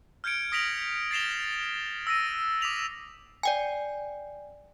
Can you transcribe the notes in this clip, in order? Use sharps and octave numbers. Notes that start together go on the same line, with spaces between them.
F6 G6 G#6 C#7 D7
D#6 A#6 B6 D7 F7 F#7
A6 A#6 C7 E7 F7 G7
E6 A#6 D#7
D6 D#6 B6 F7 F#7
D5 G5 G#5